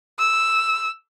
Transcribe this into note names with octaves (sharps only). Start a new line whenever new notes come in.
E6